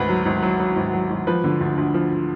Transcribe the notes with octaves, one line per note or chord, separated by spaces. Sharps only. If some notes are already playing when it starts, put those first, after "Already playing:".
Already playing: G#1 D2 B4
F#3
G#1
F#3
F#3
G#1
F#3
G#1
F3 B4
D3
D2
D2
F3